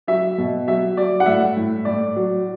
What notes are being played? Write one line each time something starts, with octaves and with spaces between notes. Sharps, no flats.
F#3 E5
B2
F#3 E5
F#3 D5
F#5
A2 E5
A2
A2 D5
F#3